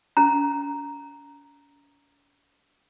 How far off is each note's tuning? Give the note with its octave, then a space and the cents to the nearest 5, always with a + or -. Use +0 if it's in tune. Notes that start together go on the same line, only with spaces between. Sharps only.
C#4 +45 A#5 +0